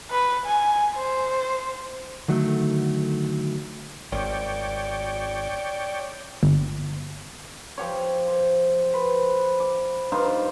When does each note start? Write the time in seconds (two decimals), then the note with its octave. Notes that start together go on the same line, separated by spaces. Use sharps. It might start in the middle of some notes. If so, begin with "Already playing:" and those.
0.10 B4
0.46 G#5
0.95 C5
2.28 D3 D#3 F#3 A3
4.12 G#1 C#5 D5 G5
6.43 G1
7.78 F3 G4 C#5
8.28 C5
8.94 B4 C5
9.60 D6
10.12 G2 D#4 F4 C5